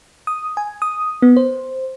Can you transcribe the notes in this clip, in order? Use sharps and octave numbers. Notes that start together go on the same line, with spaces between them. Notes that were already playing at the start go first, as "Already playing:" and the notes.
D#6
G#5
D#6
B3
C5